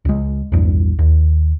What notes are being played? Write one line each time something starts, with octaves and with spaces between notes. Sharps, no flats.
C#2 G#3
A#1 E2 G2
D#2